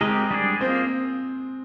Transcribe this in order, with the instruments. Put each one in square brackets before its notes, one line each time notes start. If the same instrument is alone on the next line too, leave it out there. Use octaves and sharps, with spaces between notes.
[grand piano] G#3 [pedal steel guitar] C4 G4 A#4 D#5
[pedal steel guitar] G3 D4 G#4 D5
[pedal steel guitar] A#3 F4 C5 D#5 [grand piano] C4